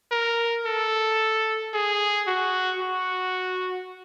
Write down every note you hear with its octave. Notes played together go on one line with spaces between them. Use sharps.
A#4
A4
G#4
F#4
F#4